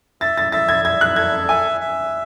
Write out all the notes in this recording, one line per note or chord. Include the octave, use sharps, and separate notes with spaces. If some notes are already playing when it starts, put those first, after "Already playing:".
E5 A6
A6
E5 A6
G#6
E5 G#6
F#6
A4 G#6
E5 G#5
E5